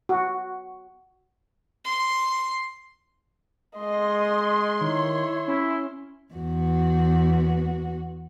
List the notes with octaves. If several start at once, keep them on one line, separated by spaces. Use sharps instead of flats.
F#4
C6
G#3 D#5 C6
D#3 E4 C#5
C#4 E4
E2 F#4